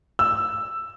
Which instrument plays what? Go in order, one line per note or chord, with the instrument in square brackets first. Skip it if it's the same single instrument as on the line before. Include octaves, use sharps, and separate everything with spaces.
[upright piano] E6